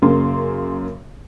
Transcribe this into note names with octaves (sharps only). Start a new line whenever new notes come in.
F#2 C#3 A#3 C6